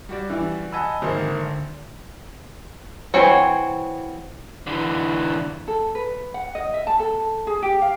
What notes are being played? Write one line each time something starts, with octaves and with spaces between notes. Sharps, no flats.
G3 F#4 D5
E3 E4
D#5 F#5 G#5 A5 B5 E6
G#1 A#3 C5 E5
D3
E3 C4 F#4 C#5
D3 E3
A4
B4
F#5
D#5
E5
A5
A4
G#4
G4
F5